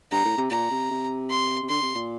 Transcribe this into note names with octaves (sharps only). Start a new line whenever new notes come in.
G2 A#5
A2
C3
A#2 A#5
C3
C3
C6
C3
D3 C6
C3
A#2